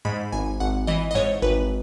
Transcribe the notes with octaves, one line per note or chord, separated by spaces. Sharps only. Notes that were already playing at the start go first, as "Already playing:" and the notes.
G#2 B5
G#1 G#5
G#1 F#5
E3 D#5
D#5
G#2 C#5
G#1 B4